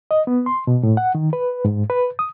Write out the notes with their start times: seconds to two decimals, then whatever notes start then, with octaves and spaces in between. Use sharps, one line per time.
0.11 D#5
0.27 B3
0.46 C6
0.67 B2
0.83 A2
0.97 F#5
1.15 D#3
1.33 B4
1.65 G#2
1.90 B4
2.19 D#6